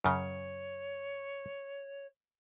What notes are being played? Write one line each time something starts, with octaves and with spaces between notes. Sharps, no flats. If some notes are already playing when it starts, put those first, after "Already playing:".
F#2 C#3 C#5